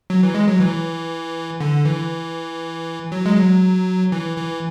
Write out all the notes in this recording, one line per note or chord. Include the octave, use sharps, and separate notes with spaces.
F#3
E3
G#3
F#3
E3
D3
E3
F#3
G#3
F#3
E3
E3